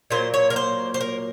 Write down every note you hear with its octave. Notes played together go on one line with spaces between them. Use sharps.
A#2 F#3 A#3 C5
C#5
A#4
C5
C5
A#4